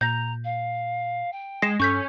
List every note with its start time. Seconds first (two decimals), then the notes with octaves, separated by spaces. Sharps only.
0.01 A#2 A#5 G6 A#6
0.44 F5
1.32 G5
1.62 G#3 A#6 C7 E7
1.80 G2 C#4 A4 C#6 G6 B6